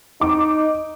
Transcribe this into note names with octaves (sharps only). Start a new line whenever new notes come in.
D#4 D6